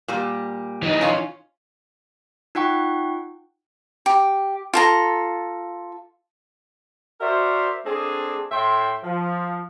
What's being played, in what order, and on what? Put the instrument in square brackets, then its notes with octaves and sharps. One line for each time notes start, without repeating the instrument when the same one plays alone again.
[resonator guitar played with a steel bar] A#2 G3
[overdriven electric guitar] E3 D#4
[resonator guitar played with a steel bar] C#4 F4
[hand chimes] D#4 F4 F#5 G5 C#6
[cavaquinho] G4
F4 A4 A#5
[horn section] F#4 A#4 C5 D5 E5
A3 C4 D4 G#4
A2 E5 G5 C6
F3